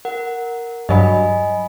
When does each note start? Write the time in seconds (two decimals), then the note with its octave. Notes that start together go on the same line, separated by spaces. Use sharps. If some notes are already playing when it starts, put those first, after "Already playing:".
0.05 A#4 F#5
0.89 G2 F#3 D#5 G#5 B5